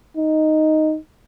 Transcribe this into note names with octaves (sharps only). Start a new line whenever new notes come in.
D#4